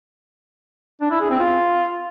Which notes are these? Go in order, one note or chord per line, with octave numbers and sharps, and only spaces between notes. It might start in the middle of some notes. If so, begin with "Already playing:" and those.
D4
E4
G#4
C4
F4